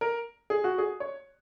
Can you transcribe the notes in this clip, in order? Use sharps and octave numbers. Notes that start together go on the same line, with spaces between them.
A#4
G#4
F#4
G#4
C#5